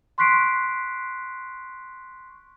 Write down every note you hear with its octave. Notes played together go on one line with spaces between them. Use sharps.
C6 C#6 F#6 B6 C7 D7